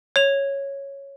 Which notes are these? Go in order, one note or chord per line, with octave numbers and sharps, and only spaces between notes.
C#5 F7